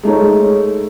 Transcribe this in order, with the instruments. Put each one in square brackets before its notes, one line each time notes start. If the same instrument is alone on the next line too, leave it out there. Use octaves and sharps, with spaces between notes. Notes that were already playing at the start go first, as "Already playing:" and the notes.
[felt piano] G#3 A3 D#4 C#5